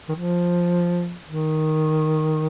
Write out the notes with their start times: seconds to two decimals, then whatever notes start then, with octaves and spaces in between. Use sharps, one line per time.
0.09 D#3
0.15 F3
1.26 D#3